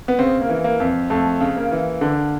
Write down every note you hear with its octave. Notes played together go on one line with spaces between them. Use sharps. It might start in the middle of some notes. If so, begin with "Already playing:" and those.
B3
C#3 C4
A#3
E3
A#3
F2
F2 A3
C#3
A#3
E3
D3